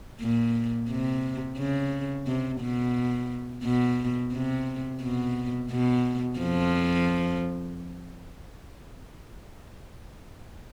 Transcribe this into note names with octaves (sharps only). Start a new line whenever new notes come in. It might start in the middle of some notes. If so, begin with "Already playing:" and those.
A#2
C3
C#3
C3
B2
B2
C3
B2
B2
F2 F3